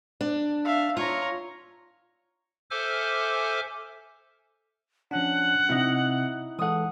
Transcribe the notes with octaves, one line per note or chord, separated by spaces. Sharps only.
D4
E5 F5
F4 C#5 A#5
A4 C5 E5 G#5 D6 F6
F3 C#4 D4 F#5
C3 C4 D#4 E4
E3 G#3 A4 F#5 D#6